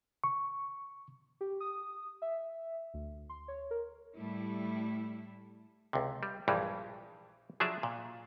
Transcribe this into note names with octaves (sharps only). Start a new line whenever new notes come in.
C#6
G4
D#6
E5
D2
C6
C#5
A#4
A2 G3 A3 E4
C#2 C3
G3
A#1 G2 E3 G3 G#3
F3 F#3 D4 G#4 E5
A#2